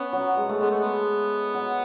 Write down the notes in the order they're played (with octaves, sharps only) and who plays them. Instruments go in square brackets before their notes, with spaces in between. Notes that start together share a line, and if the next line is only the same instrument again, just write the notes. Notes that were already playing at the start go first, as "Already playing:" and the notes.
Already playing: [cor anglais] B3 [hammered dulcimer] C#4
[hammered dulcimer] F#3
G#3
A3
[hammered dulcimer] G#3 [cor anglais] B3
[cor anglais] A3
B3
[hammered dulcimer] F#3